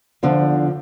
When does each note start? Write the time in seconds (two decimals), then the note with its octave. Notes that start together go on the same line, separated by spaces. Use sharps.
0.23 E2 D3 F3